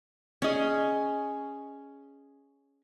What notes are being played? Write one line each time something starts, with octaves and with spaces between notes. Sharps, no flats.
C#4 G#4 C#5 D#5